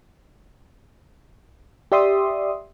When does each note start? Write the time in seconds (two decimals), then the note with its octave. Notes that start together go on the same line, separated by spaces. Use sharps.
1.92 G4 D5 E5 C6 D#6